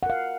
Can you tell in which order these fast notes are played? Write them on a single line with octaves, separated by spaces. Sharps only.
F#5 A#4 F5